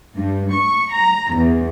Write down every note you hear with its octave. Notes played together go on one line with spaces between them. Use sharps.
G2
C#6
A#5
E2